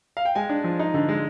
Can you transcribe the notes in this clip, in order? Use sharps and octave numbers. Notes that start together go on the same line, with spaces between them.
F5
G5
G#3 G#5
D4
F3
D#4
D3
G#3